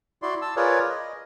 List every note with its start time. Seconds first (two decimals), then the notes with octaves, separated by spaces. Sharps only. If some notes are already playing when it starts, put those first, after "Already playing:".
0.22 E4 F#4 D5 C6
0.42 A5 E6
0.56 F4 G#4 A#4 B4 C#5 D5
0.90 D#5